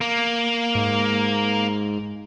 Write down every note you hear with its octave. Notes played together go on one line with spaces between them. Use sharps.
A#3
G#2